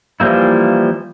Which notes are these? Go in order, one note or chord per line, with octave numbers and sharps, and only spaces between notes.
E3 F3 G3 A#3 E4